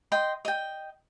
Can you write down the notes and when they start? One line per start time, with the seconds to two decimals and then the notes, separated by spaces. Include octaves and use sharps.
0.12 D#5 G5 C6
0.45 D#5 G5